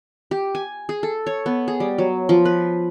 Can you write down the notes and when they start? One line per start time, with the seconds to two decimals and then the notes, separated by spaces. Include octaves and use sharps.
0.31 G4
0.55 G#5
0.89 G#4
1.03 A4
1.27 C#5
1.46 B3
1.68 G#4
1.80 G3
1.98 F#3
2.29 F3
2.45 B4